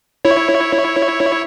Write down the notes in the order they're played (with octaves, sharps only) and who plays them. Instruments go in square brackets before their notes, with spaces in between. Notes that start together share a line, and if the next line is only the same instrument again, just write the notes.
[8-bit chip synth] E4 C#5